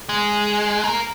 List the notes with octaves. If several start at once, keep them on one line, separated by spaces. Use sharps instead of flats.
G#3
A#3